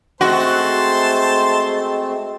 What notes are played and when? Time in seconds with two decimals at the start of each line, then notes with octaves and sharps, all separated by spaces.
0.21 G#3 A3 C4 F#4 C5 A5 C6